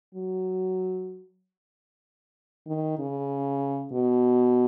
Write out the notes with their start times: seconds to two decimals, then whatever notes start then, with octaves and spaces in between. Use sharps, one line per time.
0.15 F#3
2.67 D#3
2.99 C#3
3.93 B2